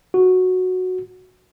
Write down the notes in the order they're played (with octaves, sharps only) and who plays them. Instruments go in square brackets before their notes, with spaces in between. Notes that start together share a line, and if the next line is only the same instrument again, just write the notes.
[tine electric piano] F#4